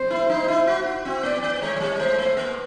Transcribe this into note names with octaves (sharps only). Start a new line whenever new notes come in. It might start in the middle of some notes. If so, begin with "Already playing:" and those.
Already playing: C5
E4
D#4
E4
F#4
F#4
C4
B3 D5
B3
G#3 C#5
F#3
G3
G#3 C5
A3
A#3